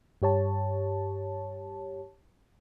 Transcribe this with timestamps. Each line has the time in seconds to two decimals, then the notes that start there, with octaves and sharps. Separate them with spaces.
0.22 G2 G4 C#5 A5